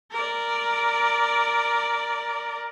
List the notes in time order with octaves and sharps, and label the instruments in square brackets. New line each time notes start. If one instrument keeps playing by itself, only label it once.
[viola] A#4 D5